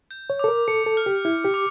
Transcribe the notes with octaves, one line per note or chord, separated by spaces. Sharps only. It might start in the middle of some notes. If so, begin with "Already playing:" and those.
G6
C#5
A4 D6
A#4
A4 C#7
A4
F6
G4
E4 F6
G4
D6